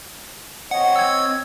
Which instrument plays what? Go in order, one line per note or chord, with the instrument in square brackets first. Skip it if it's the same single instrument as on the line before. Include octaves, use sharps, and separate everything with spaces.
[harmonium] C4 C#5 D#5 [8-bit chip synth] F#5
[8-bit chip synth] E6 G#6